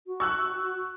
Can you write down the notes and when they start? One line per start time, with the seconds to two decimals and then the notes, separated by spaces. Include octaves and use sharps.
0.07 F#4
0.20 C#6 E6 F#6